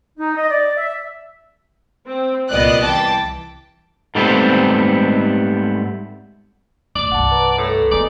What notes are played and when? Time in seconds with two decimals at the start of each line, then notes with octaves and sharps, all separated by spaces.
0.19 D#4
0.36 D#5
0.50 D5
0.77 E5
2.06 C4
2.50 C2 A#2 B3 D5 D#5 F#6
2.82 E3 G5 A5 D6
4.15 G#2 G3 A3 B3 C4
6.95 D1 G2 D5
7.12 C2 G2 F#5 A5
7.32 B4 A#5
7.58 A2 A4
7.91 G3 G#3 B3 D#4 D5